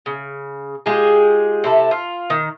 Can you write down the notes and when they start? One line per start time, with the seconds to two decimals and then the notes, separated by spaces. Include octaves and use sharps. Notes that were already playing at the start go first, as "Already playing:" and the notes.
0.06 C#3
0.86 G#3 F4 G4 G#4
1.64 C3 E4 A4
1.91 F4
2.30 D#3